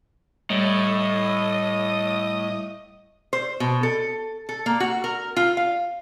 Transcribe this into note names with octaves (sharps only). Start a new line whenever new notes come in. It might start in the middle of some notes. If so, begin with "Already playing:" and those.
A2 G3 D#5
C5
B2
A4
A4
A#3
F#4
A#4
F4
F5